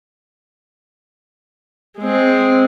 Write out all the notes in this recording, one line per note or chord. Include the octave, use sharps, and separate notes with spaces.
G#3 C4